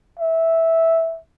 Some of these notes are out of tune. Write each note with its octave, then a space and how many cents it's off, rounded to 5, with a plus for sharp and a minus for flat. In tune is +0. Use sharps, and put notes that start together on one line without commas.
E5 -10